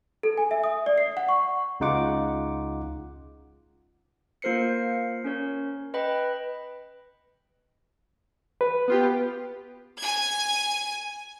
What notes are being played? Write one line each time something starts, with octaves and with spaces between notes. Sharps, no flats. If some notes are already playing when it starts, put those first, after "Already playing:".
A4
G#5
E5
D#6
D5
C7
F#5
C#6
C#2 C#3 D#4 F4 F#5 D6
A#3 F4 A#4 C5 C7 C#7
C#4 A#4 C#5
B4 D#5 G5 B5
B4
B3 F4 G4
G#5 G#6